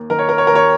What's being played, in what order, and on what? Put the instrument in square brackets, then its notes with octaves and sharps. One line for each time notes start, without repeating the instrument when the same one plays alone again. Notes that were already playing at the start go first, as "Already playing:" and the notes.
Already playing: [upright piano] D#2 A#3
D#3 A#4
C#5
A#4
C#5
A#4
D#2 C#5